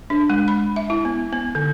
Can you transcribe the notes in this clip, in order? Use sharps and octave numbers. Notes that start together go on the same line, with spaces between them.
D4
G#3
B5
E5
E4
B3
B3
D3